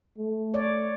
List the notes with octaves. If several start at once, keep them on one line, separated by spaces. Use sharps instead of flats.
A3
C#5 D5